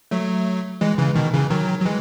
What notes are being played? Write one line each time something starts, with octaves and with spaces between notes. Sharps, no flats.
F#3 A3
E3 G#3
C#3 E3
B2 D#3
C#3 E3
D#3 F#3
F#3
E3 G#3